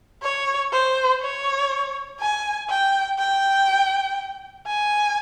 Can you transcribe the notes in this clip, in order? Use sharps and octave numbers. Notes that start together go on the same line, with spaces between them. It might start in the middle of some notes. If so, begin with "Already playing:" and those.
C#5
C5
C#5
G#5
G5
G5
G#5